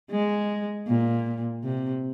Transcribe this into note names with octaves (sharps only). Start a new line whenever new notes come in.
G#3
A#2
C3